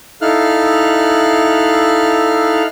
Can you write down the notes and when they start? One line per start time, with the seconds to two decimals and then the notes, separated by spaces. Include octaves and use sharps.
0.21 D#4 E4 A4 F5 F6 F#6